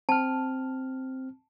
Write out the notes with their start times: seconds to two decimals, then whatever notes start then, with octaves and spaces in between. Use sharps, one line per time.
0.09 C4 A5 F6